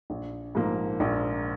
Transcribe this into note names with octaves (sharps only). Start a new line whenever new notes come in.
A#1
G#2 F3 A#3
A#1